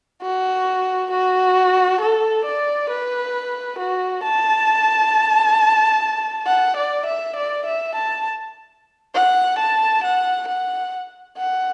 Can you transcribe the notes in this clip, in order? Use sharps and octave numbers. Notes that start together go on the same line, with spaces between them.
F#4
F#4
A4
D5
B4
F#4
A5
F#5
D5
E5
D5
E5
A5
F#5
A5
F#5
F#5
F#5